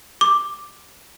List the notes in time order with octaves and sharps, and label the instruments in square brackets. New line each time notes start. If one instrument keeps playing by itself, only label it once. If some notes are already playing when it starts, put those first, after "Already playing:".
[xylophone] D6